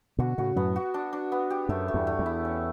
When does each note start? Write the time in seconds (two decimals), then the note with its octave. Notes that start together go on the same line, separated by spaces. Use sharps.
0.18 B2 D3 F#4
0.38 A2 C#3 F#4
0.56 F#2 A2 B3
0.76 F#4
0.94 D4
1.13 D4
1.32 B3
1.50 G4
1.69 F#2 A3
1.88 A3
1.94 E2 G2
2.07 A3
2.19 E2
2.26 E4
2.45 C#4